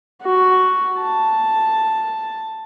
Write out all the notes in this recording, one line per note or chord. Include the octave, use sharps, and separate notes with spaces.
F#4
A5